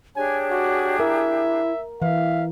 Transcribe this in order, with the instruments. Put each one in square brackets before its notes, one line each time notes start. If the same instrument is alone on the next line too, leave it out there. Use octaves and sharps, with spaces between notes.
[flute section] D4 G4 G#4 [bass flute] C#5 [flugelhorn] G#5
[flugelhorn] F#4
[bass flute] E4 [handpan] A#4 [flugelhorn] E5
[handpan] E3 [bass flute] E5 [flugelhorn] F5